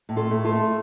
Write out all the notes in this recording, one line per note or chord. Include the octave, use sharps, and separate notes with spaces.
A2
F4 A4
A2
F4 A4
A3